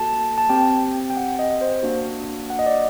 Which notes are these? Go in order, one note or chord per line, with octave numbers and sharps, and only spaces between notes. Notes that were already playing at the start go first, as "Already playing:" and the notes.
Already playing: A#3 F#4 A4 A5
A5
C4 G4 G5
G5
F#5
D#5
C5
A#3 D4 F#4
F#5
D#5
D5